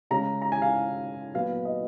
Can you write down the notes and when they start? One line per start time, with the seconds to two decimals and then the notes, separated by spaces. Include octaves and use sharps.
0.11 C#3 G#3 C#4 A#5
0.42 A#5
0.52 G#5
0.62 F5
1.34 A#2 F#3 B3 F5
1.65 D#5